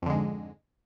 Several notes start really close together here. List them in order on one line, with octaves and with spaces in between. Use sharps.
F2 D3 G#3 G#2